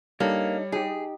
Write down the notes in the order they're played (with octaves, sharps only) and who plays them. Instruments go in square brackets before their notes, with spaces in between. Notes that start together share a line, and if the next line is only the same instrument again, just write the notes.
[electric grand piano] G3 [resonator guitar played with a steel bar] A#3 [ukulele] D4 D#4 A4 [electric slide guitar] C#5
[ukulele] D#4 G4 [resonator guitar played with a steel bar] G#4